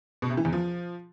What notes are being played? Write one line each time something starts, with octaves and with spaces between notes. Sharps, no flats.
B2
C3
E3
E2
F3